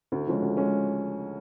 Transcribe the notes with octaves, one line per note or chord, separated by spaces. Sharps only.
D2
C#3 F3 G#3 C#4
D2
G#3 C#4